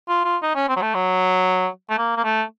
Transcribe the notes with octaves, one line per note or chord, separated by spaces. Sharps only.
F4
F4
D#4
C#4
C4
F#3
A3
F#3
A3
A#3
A#3
A3